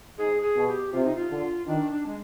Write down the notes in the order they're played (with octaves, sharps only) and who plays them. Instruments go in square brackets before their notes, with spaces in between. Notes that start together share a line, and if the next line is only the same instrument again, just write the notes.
[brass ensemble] G#2 [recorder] G#4
[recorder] G#4
[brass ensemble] B2
[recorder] G4
[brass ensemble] C3 [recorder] F4
[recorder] D#4
F4
[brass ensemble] D3
[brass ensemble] D#3 [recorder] D4
[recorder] D4
G#3